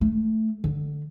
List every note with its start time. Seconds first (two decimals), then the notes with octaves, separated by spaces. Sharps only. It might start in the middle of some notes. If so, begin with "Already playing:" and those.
0.01 A3
0.64 D3